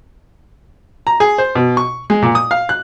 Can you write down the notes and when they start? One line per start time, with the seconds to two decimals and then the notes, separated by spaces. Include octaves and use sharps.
1.07 A#5
1.20 G#4
1.38 C5
1.55 B2
1.77 C#6
2.10 G#3
2.22 A#2
2.35 D#6
2.51 F5
2.69 F#6